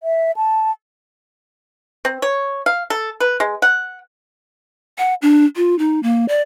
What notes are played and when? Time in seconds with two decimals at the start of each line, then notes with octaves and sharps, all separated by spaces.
0.03 E5
0.36 A5
2.05 C4
2.22 C#5
2.66 F5
2.90 A4
3.20 B4
3.40 G#3
3.62 F#5
4.98 F#5
5.22 D4
5.56 F4
5.79 D#4
6.03 A#3
6.28 D5